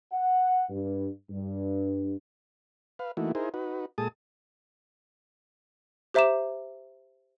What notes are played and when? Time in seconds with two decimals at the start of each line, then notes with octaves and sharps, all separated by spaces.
0.12 F#5
0.69 G2
1.30 G2
2.99 B4 F5
3.17 E3 A3 A#3 D#4 E4 F#4
3.35 D#4 E4 G#4 A#4 C5
3.54 D#4 F#4 B4
3.98 A#2 G#3 G#4 A4 A5 D#6
6.14 G4 C5 E5 A#5 D6 E7